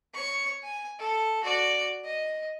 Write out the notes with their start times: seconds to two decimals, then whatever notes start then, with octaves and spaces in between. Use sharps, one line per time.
0.14 C#5 C#6
0.63 G#5
0.98 A4
1.44 F#4 D5
2.04 D#5